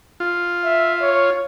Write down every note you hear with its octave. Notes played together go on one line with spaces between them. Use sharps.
F4
E5
C#5